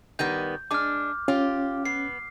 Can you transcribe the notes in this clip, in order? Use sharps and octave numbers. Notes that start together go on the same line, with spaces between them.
D#3 G3 B3 G6
G#3 D4 D6 F6
C#4 F4 G4
B3 C7